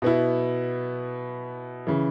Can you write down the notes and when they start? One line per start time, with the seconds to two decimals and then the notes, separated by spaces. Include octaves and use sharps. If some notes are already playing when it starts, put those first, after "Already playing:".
0.02 B2 B3 E4
1.87 C#3 E3